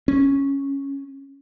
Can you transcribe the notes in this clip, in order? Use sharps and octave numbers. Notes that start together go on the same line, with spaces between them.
C#4